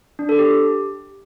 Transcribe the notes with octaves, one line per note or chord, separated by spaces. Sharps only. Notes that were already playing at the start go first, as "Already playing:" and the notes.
D4
A4
G4